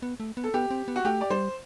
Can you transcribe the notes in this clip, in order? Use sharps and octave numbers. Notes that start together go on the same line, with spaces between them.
B3
A3
B3
A4
B3 G4
C4
B3
F#4
A3 G4
D5
G3 C5